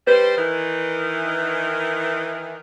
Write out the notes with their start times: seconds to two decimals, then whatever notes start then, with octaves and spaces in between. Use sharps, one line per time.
0.07 G3 B4 C5
0.37 D#3 E3